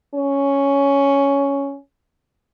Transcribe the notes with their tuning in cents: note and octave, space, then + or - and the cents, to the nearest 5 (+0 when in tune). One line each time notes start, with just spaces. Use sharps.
C#4 +5